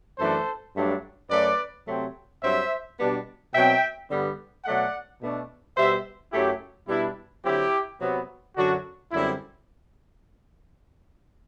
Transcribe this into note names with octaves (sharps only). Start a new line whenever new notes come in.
F#2 E3 A3 D4 A4 C5
G2 F#3 A3 D4
F#2 F#3 A3 B4 D5
C3 F#3 A3 C4
G2 F#3 C4 C5 E5
B2 G3 B3 D4
B2 F#3 C4 E5 G5
G2 D3 G3 B3
B2 F#3 A3 D5 F#5
B2 A3 D4
B2 G3 B3 C5 E5
F#2 F#3 A3 E4 G4
B2 G3 B3 D4 E4
D3 F#3 C4 E4 G4
C3 F#3 B3
F#2 D3 F#3 D4 F#4
F#2 D3 G3 C4 E4